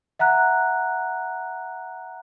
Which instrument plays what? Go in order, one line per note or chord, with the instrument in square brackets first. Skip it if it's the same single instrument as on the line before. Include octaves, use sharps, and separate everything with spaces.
[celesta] E5 F#5 A#5 F#6